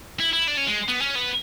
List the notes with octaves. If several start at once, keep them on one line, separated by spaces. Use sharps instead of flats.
E4
E4
D4
C#4
G#3
B3
C#4
B3